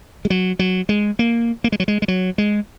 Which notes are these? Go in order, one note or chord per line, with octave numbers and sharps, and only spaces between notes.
G#3
F#3
F#3
G#3
A#3
A#3
G#3
F#3
G#3
G#3
F#3
G#3